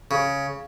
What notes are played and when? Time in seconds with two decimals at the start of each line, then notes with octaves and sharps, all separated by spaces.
0.11 C#3